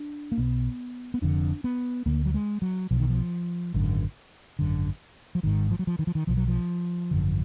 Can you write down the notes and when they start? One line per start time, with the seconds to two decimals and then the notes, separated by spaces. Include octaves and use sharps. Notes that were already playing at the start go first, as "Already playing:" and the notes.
Already playing: D4
0.32 A#3
0.37 B1 B2 B3
1.14 B3
1.22 F1 F2 D3 D4
1.64 B3
2.06 D2 D3 A#3
2.26 F#3
2.34 G#3
2.62 F#3
2.91 B1 B2 F3
3.00 D#3
3.10 F3
3.74 G#1 F#2 D3
4.59 G#1 F#2 D3
5.35 F3
5.43 G#1 G#2 D#3
5.71 F3
5.79 F#3
5.87 F3
5.99 D#3
6.07 F3
6.15 D#3
6.27 B1 B2 F3
6.37 F#3
6.48 F3
7.11 G#1 F#2 D3